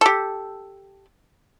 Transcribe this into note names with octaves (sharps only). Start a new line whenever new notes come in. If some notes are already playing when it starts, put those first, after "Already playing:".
G4 A4